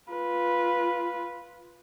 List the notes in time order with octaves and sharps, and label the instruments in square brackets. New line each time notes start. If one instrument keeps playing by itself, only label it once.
[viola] F4 B4